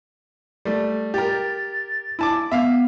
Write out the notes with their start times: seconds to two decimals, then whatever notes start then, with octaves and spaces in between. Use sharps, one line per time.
0.65 G3 A3
1.14 G4 A#4 A6
2.19 E4 A5 D6
2.52 B3 E5 F5